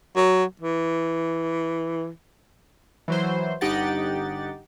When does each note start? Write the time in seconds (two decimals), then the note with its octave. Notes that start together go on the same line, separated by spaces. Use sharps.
0.16 F#3
0.61 E3
3.08 E3 F#3 C5
3.61 G1 D#4 G4 F#5 A6